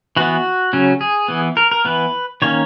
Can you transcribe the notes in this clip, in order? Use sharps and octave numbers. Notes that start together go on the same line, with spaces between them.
E3 B3 F#4
C#3 F#3 C#4
G#4
E3 B3
A#4
A#4
E3 B3 B4
D#3 A#3 C#4 C#5